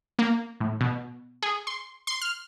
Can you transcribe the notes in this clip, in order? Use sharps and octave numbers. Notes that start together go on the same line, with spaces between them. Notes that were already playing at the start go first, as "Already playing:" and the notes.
A#3
A2
B2
G#4
C6
C6
F6